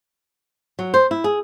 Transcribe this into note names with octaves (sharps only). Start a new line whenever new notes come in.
F#3
C5
E4
G#4